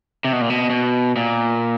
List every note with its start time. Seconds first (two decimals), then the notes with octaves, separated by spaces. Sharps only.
0.25 C3
0.33 B2
0.41 A#2
0.50 B2
0.70 B2
1.16 A#2